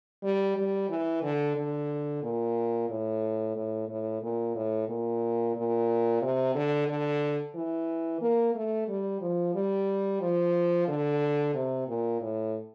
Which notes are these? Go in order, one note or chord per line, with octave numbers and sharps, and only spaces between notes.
G3
G3
E3
D3
D3
A#2
A2
A2
A2
A#2
A2
A#2
A#2
C3
D3
D3
E3
A#3
A3
G3
F3
G3
F3
D3
C3
A#2
A2